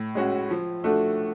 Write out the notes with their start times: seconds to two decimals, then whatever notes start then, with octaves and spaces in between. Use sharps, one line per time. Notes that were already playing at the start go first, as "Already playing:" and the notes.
Already playing: A2
0.15 G#3 C#4 F#4
0.50 F3
0.84 A3 D4 F#4 A4